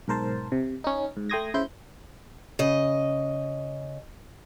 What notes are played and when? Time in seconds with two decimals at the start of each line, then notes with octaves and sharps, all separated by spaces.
0.08 B1 G#2 A#4 C5 A5
0.52 C3
0.84 C#4 D#4
1.17 G#2
1.30 A3 G5 C6 D#6 G#6 A#6
1.54 C#3 E4 C5 G6
2.59 C#3 D#5